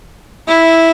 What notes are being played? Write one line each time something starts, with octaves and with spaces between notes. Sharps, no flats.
E4